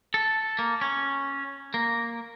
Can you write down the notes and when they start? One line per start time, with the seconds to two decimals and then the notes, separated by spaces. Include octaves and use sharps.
0.14 A4
0.59 A#3
0.81 C#4
1.74 A#3